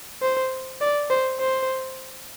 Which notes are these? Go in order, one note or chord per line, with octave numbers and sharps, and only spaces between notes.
C5
D5
C5
C5